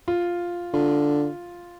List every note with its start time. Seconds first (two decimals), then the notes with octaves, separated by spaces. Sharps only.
0.08 F4
0.74 D3 F4